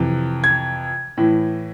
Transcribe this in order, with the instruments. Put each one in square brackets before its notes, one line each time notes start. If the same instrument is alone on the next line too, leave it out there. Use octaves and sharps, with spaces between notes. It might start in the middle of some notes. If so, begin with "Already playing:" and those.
Already playing: [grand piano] F2 C3 E3
G#6
A2 E3